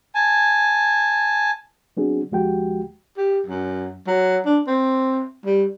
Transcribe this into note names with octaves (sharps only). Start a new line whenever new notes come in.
G#5 A5
F#3 B3 C4 D4 F#4 G#4
D#2 F3 G#3 F#4 G4 G5
G4
F#2
F#3
D4
C4
G3